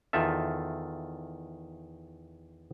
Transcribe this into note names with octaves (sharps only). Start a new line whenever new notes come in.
E2 D#3 F4 A4 E5